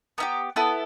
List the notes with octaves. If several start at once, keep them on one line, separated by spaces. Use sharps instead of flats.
B3 E4 G4 A#5
B3 E4 A4